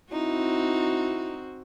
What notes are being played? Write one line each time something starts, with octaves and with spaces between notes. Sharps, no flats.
C4 D#4 E4 F#4